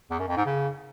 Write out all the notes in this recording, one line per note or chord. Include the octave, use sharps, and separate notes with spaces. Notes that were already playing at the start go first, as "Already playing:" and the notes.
E2
F#2
F2
G#2
C#3